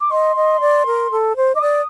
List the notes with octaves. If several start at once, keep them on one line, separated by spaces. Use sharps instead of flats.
D6
D#5 C6
D#5
D5
A#4
A4
C5
D#5 D6
D5 D#6